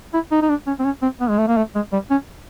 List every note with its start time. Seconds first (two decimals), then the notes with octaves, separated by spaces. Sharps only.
0.14 E4
0.32 D#4
0.42 D#4
0.49 D4
0.67 C#4
0.80 C4
0.85 C#4
1.02 C4
1.21 B3
1.30 G#3
1.38 A3
1.48 A#3
1.57 A3
1.75 G#3
1.93 G3
2.11 C#4